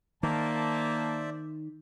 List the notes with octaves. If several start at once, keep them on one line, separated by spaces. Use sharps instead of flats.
D#3 A#3 C5 D5 E5 A5